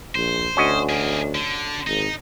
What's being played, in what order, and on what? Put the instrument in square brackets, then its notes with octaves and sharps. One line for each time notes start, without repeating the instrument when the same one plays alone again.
[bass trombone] A#1 [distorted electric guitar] C5
[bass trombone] D2 [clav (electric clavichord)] C#4 F#4 D#5
[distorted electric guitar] A#3 G#4
D3
[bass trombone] G#1 [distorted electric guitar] D#4